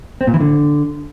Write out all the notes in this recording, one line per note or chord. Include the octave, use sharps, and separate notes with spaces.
C4
A#2
E3
D3